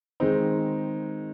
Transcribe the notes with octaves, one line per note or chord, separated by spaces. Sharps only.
D#3 G#3 C4 D#4